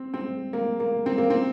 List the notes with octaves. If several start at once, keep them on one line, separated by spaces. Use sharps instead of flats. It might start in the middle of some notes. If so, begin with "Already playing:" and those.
Already playing: C4
C4
A#3
A#3
C4
A#3
C4